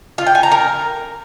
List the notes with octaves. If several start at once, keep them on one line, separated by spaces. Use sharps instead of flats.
F4
G5
G#5
A#5
A#4